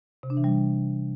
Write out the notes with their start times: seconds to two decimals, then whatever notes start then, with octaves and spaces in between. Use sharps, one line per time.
0.23 C3
0.30 D4
0.37 E3
0.44 G3